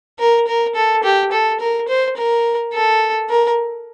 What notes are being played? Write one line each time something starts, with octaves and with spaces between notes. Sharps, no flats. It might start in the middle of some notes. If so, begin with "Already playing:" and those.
A#4
A#4
A4
G4
A4
A#4
C5
A#4
A4
A#4